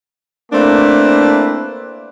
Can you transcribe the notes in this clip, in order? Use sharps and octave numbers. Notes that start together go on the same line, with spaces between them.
A3 A#3 C4 D4 E4 B4